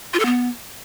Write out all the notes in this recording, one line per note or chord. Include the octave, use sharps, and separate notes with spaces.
F4
A4
B3